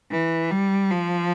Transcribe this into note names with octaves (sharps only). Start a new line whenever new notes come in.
E3
G3
F3